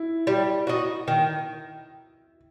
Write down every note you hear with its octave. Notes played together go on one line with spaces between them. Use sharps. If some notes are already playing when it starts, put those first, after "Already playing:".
Already playing: E4
G3
D#4 F#4
D#3